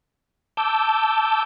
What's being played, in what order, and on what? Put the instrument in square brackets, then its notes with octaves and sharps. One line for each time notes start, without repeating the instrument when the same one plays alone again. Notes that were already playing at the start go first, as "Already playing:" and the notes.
[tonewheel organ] A5 D6 E6 G6